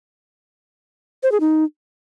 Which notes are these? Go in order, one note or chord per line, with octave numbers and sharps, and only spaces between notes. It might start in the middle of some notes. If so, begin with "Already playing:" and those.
C5
G#4
D#4